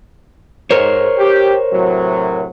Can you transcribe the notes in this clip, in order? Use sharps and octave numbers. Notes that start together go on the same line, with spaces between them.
G#2 A#4 C5 C#5
G4
A2 C3 F#3